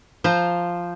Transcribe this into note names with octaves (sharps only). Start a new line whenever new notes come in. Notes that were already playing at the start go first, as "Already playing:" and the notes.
F3 C5 A#5